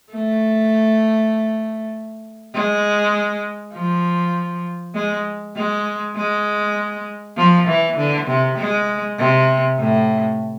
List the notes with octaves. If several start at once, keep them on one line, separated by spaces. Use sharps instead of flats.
A3
G#3
F3
G#3
G#3
G#3
F3
E3
D3
C3
G#3
C3
A2